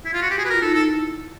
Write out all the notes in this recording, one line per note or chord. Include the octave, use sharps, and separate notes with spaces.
E4
F4
F#4
G4
F#4 G#4
B4
A#4
F4
D#4 A4
E4
A4